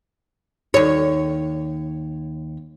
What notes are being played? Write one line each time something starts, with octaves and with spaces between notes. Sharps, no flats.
D#2 C#5